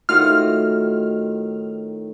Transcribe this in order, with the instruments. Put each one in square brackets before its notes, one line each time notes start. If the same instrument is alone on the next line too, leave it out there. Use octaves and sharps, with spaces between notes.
[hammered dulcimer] A2 D#3 [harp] F4 F#4 [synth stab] F6